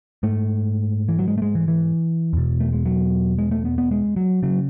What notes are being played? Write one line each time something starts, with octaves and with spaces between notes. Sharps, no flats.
G#2 A3
E3
F#3
G#3
A3
G#3
E3
E3
E2 B2
A3
G#3
F#3
G#3
A3
B3
B3
G#3
F#3
C#3 F#3